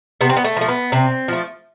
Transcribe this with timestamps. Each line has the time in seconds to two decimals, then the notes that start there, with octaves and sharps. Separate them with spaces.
0.21 C3 B3
0.30 C4
0.37 B3
0.44 A3
0.56 F3 A3
0.69 B3
0.92 C3 C4
1.28 F3 A3